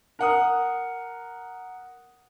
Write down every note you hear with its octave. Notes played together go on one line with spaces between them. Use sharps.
A#4 F#5 D#6